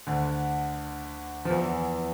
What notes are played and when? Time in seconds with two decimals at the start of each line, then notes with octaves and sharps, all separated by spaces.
0.07 D2 D3
1.45 F3
1.50 E2 E3